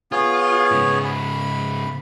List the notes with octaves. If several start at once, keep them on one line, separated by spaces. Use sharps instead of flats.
B3 F4 G#4 C#5
G#2 C#3
B5